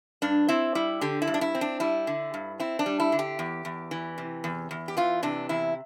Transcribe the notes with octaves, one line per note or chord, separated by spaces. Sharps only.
G2 D4
C4 E4
G3 E4
D3 G4
E4
G2
D4
E4
C4
D4
G3 E4
D3
G2
C4 E4
D4
G3
E4
D3
G4
E2
E2
E3
C3
E2
E2
G4
E3 F4
C3 D4
E2 E4